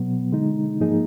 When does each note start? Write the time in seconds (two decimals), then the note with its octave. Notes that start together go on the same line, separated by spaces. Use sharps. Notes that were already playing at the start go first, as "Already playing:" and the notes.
Already playing: B2 F#3 B3
0.32 D3 G#3 D#4
0.80 G#2 F3 A#3 D#4 G#4